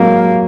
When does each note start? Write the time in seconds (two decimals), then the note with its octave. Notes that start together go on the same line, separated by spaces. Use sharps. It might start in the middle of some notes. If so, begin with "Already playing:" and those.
Already playing: F#3 G#3 A#3